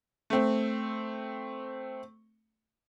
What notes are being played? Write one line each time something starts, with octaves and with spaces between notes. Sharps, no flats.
A3 C4